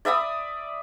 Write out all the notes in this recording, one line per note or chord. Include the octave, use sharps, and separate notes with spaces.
D5 E5 B5 D#6